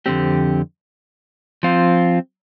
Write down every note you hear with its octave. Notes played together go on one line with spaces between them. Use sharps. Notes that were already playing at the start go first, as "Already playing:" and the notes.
F2 D3 G3 C4 G4
F3 C4 F4